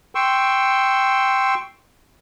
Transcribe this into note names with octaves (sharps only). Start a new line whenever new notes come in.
G5 C6 C#6 E6